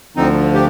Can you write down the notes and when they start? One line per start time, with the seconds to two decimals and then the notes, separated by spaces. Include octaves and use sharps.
0.17 D2 D3 F3 C4 D#4
0.54 G4